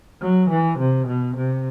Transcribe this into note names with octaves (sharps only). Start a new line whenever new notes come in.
F#3
E3
C3
B2
C3